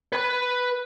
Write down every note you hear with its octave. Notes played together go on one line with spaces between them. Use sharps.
B4 B5